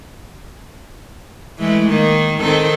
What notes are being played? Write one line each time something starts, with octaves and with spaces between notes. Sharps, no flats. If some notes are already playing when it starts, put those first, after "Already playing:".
E3 G#3 A3
D#3 A#3
D#3 C4 A4